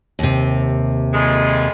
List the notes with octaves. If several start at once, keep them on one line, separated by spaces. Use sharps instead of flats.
D#2 C3
F2 A#2 G#3